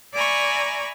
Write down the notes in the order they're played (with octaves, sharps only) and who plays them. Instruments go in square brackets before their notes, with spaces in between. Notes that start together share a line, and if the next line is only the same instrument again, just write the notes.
[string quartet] D5 E5 G#5 A#5 B5 C#6